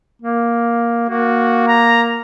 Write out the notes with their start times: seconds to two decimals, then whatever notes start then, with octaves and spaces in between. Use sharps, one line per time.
0.22 A#3
1.09 A#3 F#4
1.67 A#5